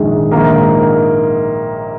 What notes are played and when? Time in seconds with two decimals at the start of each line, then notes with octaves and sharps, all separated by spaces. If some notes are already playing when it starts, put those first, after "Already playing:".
Already playing: A#1 G#2 D#3 G#3 G#4
0.31 A#1 G#2 D#3 A#3 A#4